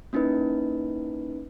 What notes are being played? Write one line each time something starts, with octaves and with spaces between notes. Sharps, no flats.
A#3 C#4 D#4 E4 B4